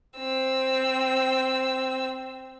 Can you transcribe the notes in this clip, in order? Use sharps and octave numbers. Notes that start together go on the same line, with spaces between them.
C4 E6